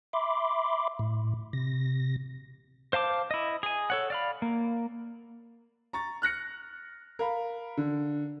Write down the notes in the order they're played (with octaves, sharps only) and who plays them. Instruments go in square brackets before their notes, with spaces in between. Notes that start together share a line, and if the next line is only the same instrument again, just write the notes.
[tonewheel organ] E5 B5 C6 D6
A2
C3 A#6
[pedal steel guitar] C5 F5 A5 D6
E4 D#5
G#4 G#5
A4 C#5 F#5
D5 F5 B5
A#3
[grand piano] A#5 C#6 A6
F6 F#6 A#6 C#7
A#4 F5 B5
D3